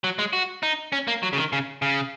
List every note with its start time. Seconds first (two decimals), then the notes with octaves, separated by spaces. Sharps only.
0.04 F#3
0.19 G#3
0.33 F#4
0.63 D#4
0.92 C#4
1.08 A#3
1.23 F#3
1.33 C#3
1.38 D#3
1.53 C#3
1.82 C#3